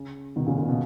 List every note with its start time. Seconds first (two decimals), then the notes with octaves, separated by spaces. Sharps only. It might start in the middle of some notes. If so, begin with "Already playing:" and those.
Already playing: C#3
0.36 B2 D#3
0.47 A#2 C#3
0.58 A#2 C#3
0.69 B2